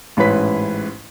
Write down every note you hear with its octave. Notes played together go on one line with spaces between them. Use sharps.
A1 G#2 C#4 E4 B4 B6